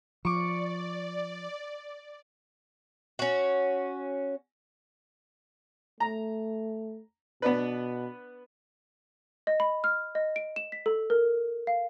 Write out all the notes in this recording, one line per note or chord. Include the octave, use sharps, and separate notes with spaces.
F3 D5 C#6 D6
C#4 F#4
A3 A#5
B2 B3 D4 B4
D#5
B5
F6
D#5
D7
E7
B6
A4
A#4
F5